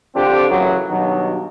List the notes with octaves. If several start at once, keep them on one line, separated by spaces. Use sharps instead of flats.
D3 F3 C4 D4 F4 G4
F#2 A2 C#3 E3 F#3
G2 B2 D#3 F#3